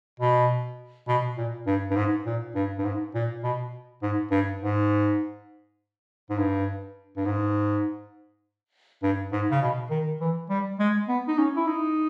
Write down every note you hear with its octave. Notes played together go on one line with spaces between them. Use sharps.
B2
B2
A#2
G2
G2
G#2
A#2
G2
G2
G#2
A#2
B2
G#2
G2
G#2
G#2
G2
G2
G#2
G2
G#2
C#3
B2
D#3
E3
G3
G#3
B3
D#4
C#4
E4
D#4